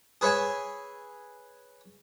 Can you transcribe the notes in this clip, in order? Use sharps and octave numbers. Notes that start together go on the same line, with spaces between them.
G#4 B4 C#5 E5 G#5